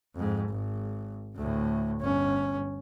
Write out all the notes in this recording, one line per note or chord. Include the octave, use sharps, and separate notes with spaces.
F2 G#2
G#1
D2 A2
G1 C#4